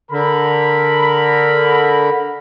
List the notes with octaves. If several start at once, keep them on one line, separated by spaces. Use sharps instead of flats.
D3 A#4 B5